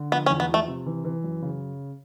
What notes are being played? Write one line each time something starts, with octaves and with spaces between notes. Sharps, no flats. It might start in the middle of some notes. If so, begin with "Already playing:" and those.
Already playing: D3
F3 B3
C#4
E2
B3
F3 A3
C3
E3
E3
F#2
C#3